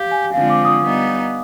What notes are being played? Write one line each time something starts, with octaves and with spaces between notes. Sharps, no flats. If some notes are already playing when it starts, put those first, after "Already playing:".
Already playing: G4 F5
G#5
D3 F3 G#3 C4 F5
D6
D#6
G3 B3 D#4